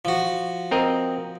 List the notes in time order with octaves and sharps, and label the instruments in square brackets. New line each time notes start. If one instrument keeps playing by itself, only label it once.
[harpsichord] F3 F#4
[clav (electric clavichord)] C4 A#4 D#5